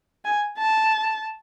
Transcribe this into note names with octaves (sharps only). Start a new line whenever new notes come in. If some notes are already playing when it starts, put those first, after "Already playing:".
G#5
A5